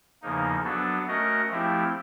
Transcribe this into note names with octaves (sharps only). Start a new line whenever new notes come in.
E2 C#3 F3 A#3 D#4
F#3 B3 D4 F#4 A4
A3 C#4 F#4 A#4 D#5
F3 A3 C4 E4 G4